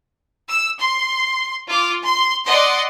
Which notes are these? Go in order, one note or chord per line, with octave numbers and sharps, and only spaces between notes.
E6
C6
F4 D6
C6
D5 D#5 F#5 C6